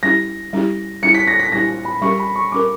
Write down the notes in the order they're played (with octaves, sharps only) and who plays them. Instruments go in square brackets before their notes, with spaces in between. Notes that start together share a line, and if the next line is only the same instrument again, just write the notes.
[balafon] G3 C#4 E4 G4 [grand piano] A#6
[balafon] G3 C#4 E4 G4
[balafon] G3 C#4 E4 G4 [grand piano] C#7
[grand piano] B6
A#6
B6
[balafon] G3 C#4 E4 G4 [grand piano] A#6
[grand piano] B5
[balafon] G3 C#4 G4 A#4 [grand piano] C#6
[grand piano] B5
C#6
[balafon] G3 C#4 G4 A#4 [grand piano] D6